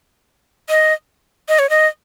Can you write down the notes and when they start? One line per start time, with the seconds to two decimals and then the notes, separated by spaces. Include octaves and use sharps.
0.69 D#5
1.48 D#5
1.59 C#5
1.70 D#5